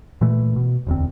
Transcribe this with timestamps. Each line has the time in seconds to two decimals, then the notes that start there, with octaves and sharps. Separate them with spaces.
0.21 A#2 E3 A3
0.56 B2
0.87 E1 D2 C4